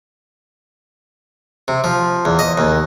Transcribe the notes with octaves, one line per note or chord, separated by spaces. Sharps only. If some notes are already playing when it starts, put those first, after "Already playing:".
C3
F3
E2
D#5
D#2